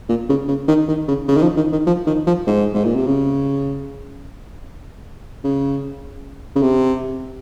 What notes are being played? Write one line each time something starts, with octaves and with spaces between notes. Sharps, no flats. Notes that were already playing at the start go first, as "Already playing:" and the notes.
A#2
C#3
C#3
D#3
D#3
C#3
C#3
D#3
F3
D#3
D#3
F3
D#3
F3
G#2
G#2
A#2
C3
C#3
C#3
C#3
C3